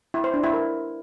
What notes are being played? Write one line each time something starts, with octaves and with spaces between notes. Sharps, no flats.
E4
C5
D4
E4
A#4